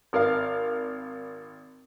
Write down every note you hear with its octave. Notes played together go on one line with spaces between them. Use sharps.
G#1 A#4 F5